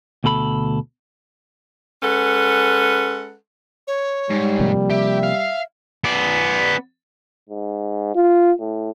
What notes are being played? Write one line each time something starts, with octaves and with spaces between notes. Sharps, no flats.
D2 B2 A4 B5
G#3 C#4 A4 B4 F#5
C#5
G#2 G3
C3 F3 A#3
G4 E5
F5
B3 D5
G#2
F4
A2